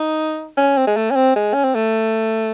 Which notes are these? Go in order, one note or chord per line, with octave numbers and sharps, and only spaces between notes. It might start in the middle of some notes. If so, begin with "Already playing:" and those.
Already playing: D#4
C#4
C4
G#3
A3
C#4
C4
G#3
C#4
C4
A3